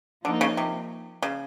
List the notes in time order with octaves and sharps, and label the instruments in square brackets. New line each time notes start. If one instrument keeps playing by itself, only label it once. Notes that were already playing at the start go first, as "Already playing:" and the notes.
[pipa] D3 [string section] F3 A#3 D#4
[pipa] C#3
C3
C#3